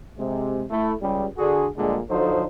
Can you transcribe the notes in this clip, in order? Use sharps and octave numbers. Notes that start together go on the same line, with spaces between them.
C3 G#3
A3 E4
C#2 G3
D3 F#4 G#4
A#1 A#2 D3 G3 G#3
D3 F3 F#3 D#4 A4 C5